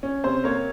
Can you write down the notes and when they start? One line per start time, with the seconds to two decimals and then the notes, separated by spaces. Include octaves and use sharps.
0.03 C#4
0.24 C3 C5
0.44 A#3 C#5